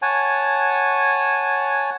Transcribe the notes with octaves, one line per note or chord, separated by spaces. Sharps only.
C#5 F#5 G#5 A5